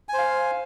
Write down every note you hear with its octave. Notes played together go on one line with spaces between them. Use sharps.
C5 F5 G#5